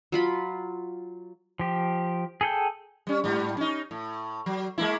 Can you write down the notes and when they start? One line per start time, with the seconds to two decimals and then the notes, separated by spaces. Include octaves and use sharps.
0.12 F#3 F4 B5
1.59 F3 G4
2.41 G#4 A4 G5
3.07 G3 C#4
3.24 G#2 G3
3.57 C#4 D#4
3.91 A2
4.46 F#3
4.78 G#3 A#3 E4